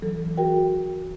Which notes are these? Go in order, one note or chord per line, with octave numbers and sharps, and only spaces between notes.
E3 F#3 A4
F#4 G#4 A#4 G5